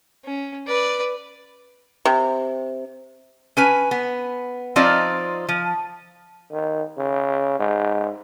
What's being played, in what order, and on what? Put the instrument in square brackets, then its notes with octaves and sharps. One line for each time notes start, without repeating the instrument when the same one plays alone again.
[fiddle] C#4
B4 D5
[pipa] C3
[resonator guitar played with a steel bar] C#4 B4 G#5
B3
F3 C4 D#4 F4 D5
F3
[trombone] D#3
C#3
G#2